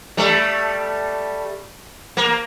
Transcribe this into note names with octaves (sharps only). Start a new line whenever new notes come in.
G3 A3
A#3